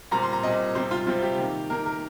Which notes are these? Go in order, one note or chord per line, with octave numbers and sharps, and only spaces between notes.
A#2 G3 C4 A#5
C6
A#5
A#2 G3 C4 D#5
C3 G3 C4 C5
F4
C3 G3 C4 F4
G4
D#3 A#3
D#3 A#3 A#4
A#4